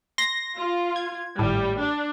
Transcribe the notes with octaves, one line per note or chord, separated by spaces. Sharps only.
C6 A#6
F4
G#6
G#1 A2 G3
D4